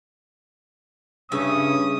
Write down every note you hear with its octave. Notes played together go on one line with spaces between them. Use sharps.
G2 C#3 C#4 E5 D#6